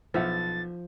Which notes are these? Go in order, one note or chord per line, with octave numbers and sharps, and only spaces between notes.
B1 F3 E5 F#5 A6